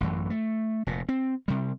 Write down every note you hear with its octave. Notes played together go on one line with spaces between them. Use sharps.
A1 F#2 E3
A3
F1 A#2
C4
C3 G3